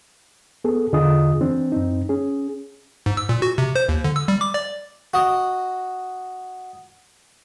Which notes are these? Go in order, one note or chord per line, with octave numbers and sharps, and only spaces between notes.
B3 G#4 A4
E2 D3 F4 G#4 D#5 D#6
E3 C4 D4
F#2 C4 D#4
C#4 G#4
G#2
E6
A#2
F#4
C3
C5
D#2
D3
E6
G3
D6
D5
F#4 D#5